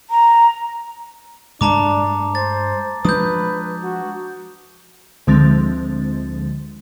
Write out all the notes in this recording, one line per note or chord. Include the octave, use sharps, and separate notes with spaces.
A#5
G2 G#3 A3 D4 A5 A#5 D6
C5 A6
F3 G#3 D4 B4 D#6 G6
F#4
D2 D3 F3 G#3 C4 A6